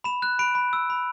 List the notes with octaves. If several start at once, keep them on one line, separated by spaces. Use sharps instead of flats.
B5 E7
F#6
B5 D7
B5
E6
B5